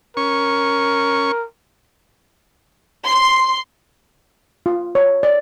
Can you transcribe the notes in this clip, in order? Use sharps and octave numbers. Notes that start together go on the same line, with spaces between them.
C#4 A#4 C#6
C6
F4
C#5
D5